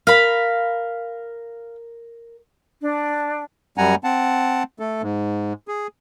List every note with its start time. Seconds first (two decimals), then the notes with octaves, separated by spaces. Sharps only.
0.07 A#4 F5 B5
2.81 D4
3.78 F#2 G3 F#5 G#5 A#5
4.04 C4 F#5 A5
4.79 A3 A4
5.02 G#2
5.68 G#4